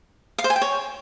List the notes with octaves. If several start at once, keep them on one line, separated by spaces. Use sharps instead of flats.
F5
C5
G#5
G5
C#5